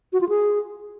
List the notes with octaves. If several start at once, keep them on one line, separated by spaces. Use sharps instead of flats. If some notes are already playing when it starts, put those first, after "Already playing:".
F#4
F4
G#4